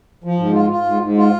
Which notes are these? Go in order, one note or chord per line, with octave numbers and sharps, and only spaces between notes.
F3
G#2
F4
F4
G#2
G#2
F4